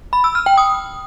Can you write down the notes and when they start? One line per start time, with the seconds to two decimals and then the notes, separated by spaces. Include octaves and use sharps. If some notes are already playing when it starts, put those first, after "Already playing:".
0.13 B5
0.24 E6
0.35 F6
0.46 G5
0.58 D#6